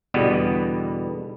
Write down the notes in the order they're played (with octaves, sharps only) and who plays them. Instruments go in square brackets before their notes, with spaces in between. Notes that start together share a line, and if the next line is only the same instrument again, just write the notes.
[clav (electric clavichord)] E2 B2 D3 G3 B3